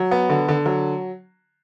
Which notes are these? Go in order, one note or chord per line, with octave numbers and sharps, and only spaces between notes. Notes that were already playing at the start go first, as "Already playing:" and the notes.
Already playing: F#3
B3
D3
D3
F#3